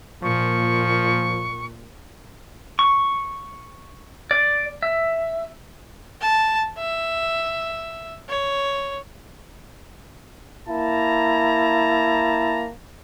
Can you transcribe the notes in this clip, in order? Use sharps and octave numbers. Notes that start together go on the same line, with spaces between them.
A#2 F3 C#6
C#6
D5
E5
A5
E5
C#5
A#3 E4 A5 A#5